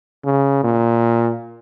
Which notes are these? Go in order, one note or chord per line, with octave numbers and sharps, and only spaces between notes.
C#3
A#2